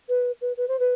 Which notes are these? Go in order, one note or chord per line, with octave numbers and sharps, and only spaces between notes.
B4
B4
B4
C5
B4